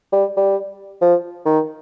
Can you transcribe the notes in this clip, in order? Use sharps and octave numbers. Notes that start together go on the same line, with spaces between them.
G3
G3
F3
D#3